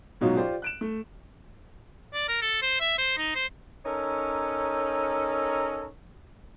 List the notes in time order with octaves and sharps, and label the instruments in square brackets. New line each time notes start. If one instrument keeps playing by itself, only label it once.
[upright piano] G#2 B2 F#3 C#4 D#4 F4
F4 G4 C5 D5
F#6 D7 E7
A3
[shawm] D5
A#4
A4
C5
E5
C5
D#4
C5
[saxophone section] C#4 D#4 A4 A#4 C#5